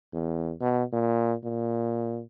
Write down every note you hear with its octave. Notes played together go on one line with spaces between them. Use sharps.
E2
B2
A#2
A#2